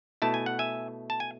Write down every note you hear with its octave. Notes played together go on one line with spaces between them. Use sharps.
B2 A3 E4 A5
G#5
F#5
E5 G#5
A5
G#5